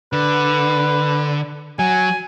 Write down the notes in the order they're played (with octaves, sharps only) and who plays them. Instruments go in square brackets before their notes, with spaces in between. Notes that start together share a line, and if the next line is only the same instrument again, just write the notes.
[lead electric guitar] D3 [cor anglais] B4
[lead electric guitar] F#3 [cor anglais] G#5